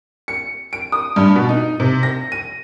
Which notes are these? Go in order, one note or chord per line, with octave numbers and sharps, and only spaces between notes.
C#7
D7
D#6
G2
B2
D#4
C3
A#6
D#7